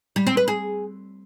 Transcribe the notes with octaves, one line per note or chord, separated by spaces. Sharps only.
G3
C4
B4
G#4